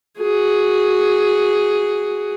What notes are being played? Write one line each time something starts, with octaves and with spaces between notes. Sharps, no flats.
F#4 G#4